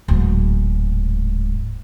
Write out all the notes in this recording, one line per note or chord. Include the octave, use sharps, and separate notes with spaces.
D1 G#2